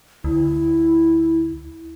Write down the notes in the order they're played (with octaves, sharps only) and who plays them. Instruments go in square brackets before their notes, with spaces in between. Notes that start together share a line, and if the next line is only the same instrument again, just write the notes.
[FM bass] D2 [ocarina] E4